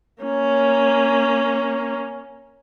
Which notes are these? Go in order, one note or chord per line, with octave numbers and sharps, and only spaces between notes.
A#3 C#4